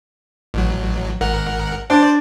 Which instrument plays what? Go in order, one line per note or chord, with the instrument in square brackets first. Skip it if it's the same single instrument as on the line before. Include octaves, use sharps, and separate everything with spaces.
[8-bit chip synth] A1 F#3
G#1 A#4 F#5
[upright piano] D4 [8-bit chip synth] C5 D5